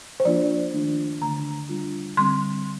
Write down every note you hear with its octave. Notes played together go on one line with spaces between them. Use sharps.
C5
F3 A#3 D4 F4 D5
D#3 A3 D4 F4
D3 A3 D4 A#5
G3 D4 F4
D3 G3 C4 C6